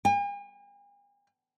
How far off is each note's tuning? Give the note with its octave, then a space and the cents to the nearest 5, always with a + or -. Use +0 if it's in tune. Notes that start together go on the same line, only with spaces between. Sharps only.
G#5 -45